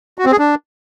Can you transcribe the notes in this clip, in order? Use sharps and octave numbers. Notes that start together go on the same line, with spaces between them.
F#4
C4
G#4
D4